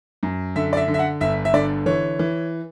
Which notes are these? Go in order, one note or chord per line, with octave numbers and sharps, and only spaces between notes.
F#2
D3 E5
D5
E5
D3
E5
F#5
G1 E5
E5
D3 D5
E3 C#5
E3